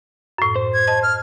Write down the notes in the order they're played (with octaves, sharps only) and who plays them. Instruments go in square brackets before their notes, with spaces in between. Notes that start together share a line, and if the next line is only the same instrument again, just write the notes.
[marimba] F#2 A2
[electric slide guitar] C5
[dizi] G#6
[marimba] D#5 A5
[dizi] F6